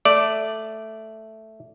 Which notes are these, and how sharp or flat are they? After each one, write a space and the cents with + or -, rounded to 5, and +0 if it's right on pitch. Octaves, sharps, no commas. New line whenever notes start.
A3 +0 D5 +0